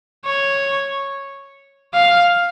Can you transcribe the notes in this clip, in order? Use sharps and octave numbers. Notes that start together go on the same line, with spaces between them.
C#5
F5